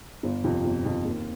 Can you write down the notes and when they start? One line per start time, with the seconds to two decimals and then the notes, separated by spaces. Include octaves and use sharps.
0.23 G1
0.44 F2 C3
0.64 G1
0.85 F2 C3
1.05 D#2